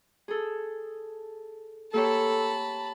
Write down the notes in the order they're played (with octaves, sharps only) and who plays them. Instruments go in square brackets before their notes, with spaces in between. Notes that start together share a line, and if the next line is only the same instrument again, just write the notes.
[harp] G#4 A4
[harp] A#3 G4 C#5 [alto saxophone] A4 [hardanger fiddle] A5 B5